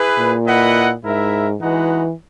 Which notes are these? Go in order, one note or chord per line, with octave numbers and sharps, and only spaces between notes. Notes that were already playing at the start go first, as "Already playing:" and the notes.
Already playing: E4 G#4 B4
A#2
E4 B4 D#5 F#5
G#2 E4 A#4 E5
E3 G#3 D#4 F#4 B4 F#5